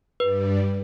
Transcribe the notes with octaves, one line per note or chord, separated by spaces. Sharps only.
G2 G3 B4